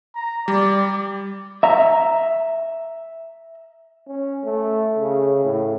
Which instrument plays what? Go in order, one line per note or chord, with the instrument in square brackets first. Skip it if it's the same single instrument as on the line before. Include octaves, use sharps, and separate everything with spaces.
[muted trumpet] A#5
[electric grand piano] G3 [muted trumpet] D5
[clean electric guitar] E5 A#5
[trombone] C#4
A3
C#3
A2